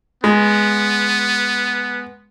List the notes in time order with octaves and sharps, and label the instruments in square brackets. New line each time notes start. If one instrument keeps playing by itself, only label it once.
[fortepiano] G#3 [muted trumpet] B3